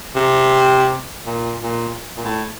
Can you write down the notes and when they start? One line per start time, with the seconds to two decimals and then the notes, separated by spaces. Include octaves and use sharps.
0.15 C3
1.26 A#2
1.63 A#2
2.17 A#2
2.25 A2